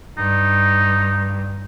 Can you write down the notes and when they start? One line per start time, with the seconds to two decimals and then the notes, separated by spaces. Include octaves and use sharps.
0.17 G2 D#4